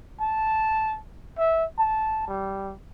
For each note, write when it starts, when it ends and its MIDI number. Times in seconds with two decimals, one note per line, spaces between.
0.21 0.95 81
1.38 1.64 76
1.79 2.23 81
2.28 2.73 55